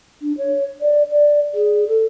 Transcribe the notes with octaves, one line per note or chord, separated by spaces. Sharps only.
D4
C#5
D5
D5
G#4
A4